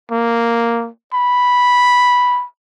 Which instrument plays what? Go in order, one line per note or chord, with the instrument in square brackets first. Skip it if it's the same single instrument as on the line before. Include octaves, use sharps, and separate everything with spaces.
[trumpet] A#3
B5